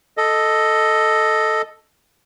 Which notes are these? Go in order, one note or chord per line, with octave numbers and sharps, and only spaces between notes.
A4 D#5